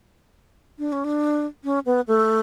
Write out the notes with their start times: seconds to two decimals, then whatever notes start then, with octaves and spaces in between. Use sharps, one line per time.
0.79 D4
0.92 C#4
1.04 D4
1.64 C#4
1.86 B3
2.07 A3